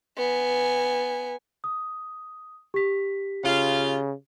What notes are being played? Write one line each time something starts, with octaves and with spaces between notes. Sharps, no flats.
B3 G#5
D#6
G4 B6
C#3 F4 F5